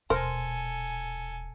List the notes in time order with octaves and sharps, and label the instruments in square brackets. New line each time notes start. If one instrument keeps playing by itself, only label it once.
[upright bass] D#1 [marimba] B2 C6 A#6 [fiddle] A4 G#5 [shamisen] A#4 C5